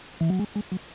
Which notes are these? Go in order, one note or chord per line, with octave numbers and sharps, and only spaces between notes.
E3
F#3
G#3
G#3
F#3